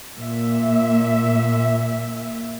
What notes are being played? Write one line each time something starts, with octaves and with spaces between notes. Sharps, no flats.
A#2 E5